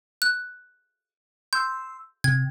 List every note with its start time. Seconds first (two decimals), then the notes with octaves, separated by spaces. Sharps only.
0.22 F#6
1.53 C6 E6 G6
2.24 C3 G#6